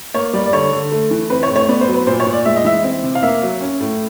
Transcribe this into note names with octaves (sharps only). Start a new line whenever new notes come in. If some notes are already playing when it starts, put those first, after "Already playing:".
A#3 C#5
G3 D5
D5
D3 C#5
D3
A3
E3
C4 B4
C#5
A2
C#5
B3 D5
C5
F#3
B4
A#2 C5
C#5
A#2
D5
G#3 E5
D#5
E3 E5
C4
C3
F5
A#3 E5
F#3
C#4
A2